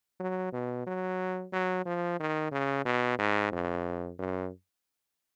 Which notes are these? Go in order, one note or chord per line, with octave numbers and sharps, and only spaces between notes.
F#3
B2
F#3
F#3
F3
D#3
C#3
B2
G#2
F2
F#2